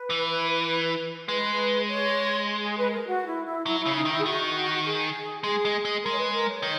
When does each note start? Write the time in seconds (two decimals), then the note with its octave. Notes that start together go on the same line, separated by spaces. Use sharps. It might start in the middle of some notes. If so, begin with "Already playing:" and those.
Already playing: B4
0.10 E3
1.29 G#3 B4
1.88 C#5
2.62 G#4
2.76 B4
2.92 A#4
3.06 F#4
3.26 E4
3.46 E4
3.66 F#3 E4
3.80 E4
3.86 C#3
3.95 D#4
4.06 D#3 E4
4.18 G#4
4.25 D#3 F#4
4.84 G#4
5.44 G#3 G#4
5.65 G#3
5.85 G#3
6.03 G#3 A#4
6.11 C#5
6.18 B4
6.33 A#4
6.47 C#5
6.62 D#3